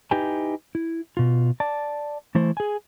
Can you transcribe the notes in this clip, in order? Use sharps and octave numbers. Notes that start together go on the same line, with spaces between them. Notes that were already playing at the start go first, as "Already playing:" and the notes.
D#4 E4 G4 B4 G5 G#5
E4
B2 F4
D5 A5
E3 A3 E4 C5
G#4 G#5